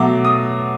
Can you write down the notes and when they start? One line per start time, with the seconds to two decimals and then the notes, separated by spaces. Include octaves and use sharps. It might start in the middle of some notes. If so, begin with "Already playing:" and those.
Already playing: B2 F#3 A3 D6
0.25 D#6